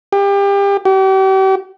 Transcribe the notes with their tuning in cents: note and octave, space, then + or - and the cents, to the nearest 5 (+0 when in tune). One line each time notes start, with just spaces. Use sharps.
G4 +30
G4 -40